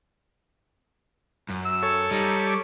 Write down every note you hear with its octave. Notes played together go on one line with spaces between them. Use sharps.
F#2
E6
A4 C#5
G3 D#4
D6